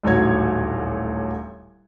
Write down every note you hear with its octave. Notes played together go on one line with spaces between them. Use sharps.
D#1 A1 D2 F#3 C#5 G#6